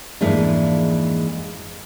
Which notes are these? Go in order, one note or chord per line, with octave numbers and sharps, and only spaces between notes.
F2 G#2 E3 G#3 A#3 D4